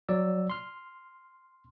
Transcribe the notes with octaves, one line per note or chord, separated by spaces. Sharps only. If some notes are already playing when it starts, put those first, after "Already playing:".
F#3 D5 E6
C6 F6